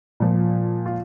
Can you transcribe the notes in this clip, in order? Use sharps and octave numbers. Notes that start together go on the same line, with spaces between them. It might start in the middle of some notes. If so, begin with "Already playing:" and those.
A#2 F3
F4